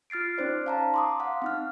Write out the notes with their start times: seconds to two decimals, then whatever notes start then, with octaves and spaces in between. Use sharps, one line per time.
0.10 F4 F6 A6 C7 D7
0.38 C#4 D#4 C5 D5
0.66 F5 A5 A#5
0.94 C6 D6 D#6
1.20 F5 F#5
1.42 C4 D#4 F6